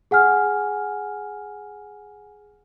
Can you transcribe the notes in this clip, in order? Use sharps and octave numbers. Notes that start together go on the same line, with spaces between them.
G#4 F#5 G#5 F6